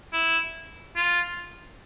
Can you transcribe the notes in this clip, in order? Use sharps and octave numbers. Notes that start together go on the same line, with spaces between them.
E4
F4